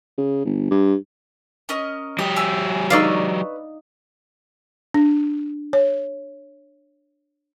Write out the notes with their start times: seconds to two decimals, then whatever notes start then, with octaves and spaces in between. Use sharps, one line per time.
0.18 C#3
0.45 G1
0.70 G2
1.69 C#4 A#4 D#5
2.19 F#3 G4 D#6
2.36 E5 G#5 E6
2.90 D#4 B4 D5 F5 C#6 E6
4.94 D4
5.73 C#5